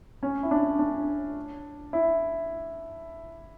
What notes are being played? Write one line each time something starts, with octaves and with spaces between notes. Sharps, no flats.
C#4
E4
D4
D4
E4